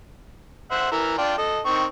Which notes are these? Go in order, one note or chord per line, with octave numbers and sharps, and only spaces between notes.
C5 E5 F#5
E3 A#4 E5
D4 F4 G5
A4 D#5
D#3 C4 C#6